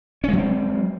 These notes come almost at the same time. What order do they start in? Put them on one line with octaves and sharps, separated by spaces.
C#4 G#3 F#3 C4